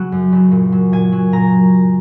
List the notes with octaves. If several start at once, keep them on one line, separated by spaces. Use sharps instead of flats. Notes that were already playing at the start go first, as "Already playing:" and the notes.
Already playing: C#3 F#3 F#5
F#2
C#3 F#3
A#2
F#3
A#2 G#5
F#3
A#2 A#5